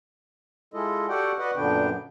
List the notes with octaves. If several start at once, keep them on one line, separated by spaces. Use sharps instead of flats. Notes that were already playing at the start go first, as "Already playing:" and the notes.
G#3 E4 F4 A4 D#5
F#4 G4 A4 D5 F#5 G5
F#4 B4 D5 D#5 F#5
F#2 A#2 D3 B3 D4 G5